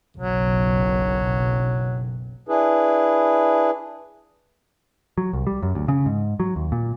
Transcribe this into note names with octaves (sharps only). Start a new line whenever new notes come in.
F#1 B1 F#3
D4 E4 G#4 B4
F#3
C2
G3
F#2
D2
C#3
G#2
F#3
D#2
A#2